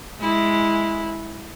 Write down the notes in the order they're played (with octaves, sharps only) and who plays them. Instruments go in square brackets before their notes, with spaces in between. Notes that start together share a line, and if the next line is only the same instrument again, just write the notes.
[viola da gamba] G#3 E4